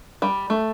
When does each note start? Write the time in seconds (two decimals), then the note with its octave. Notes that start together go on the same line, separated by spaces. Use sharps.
0.22 G3
0.50 A3